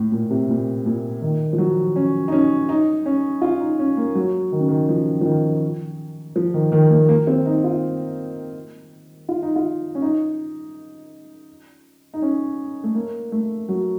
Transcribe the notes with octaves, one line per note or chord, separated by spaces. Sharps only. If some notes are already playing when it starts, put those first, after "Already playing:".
Already playing: A2
A#2
C3
A#2
A#2
D#3
F3
F#3
C#4
D#4
C#4
D#4
C#4
F4
D#4
C#4
A#3
F#3
D#3
C#3
D#3
F3
F3
D#3
F3
D#3
D#3
A#3
A#3
C4
D#4
F4
F4
D#4
F4
C#4
D#4
D#4
C#4
A3
A#3
A3
F#3